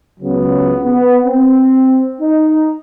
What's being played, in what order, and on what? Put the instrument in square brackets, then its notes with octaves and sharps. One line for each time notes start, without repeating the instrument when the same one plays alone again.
[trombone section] C#2 C#3 F#3 B3
B3
C4
D#4